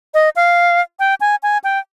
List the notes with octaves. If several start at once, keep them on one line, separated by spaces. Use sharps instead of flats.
D#5
F5
G5
G#5
G#5
G5